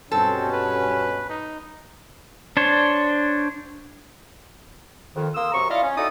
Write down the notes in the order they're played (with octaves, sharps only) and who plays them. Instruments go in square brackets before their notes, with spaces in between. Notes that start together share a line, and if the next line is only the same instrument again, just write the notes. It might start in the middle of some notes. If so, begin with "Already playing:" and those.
[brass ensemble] G2 B2 C#4 [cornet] C4 [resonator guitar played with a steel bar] A4
[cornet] B4
D#4
[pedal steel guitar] D4 C5 C#5
[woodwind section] F2 D#3
A#3 F5 C6 D#6 E6
F#2 C3 A#5 C#6
E4 F4 D5 D#5 F5
C#4
D#4 E4 F#4 A4 D5 D#6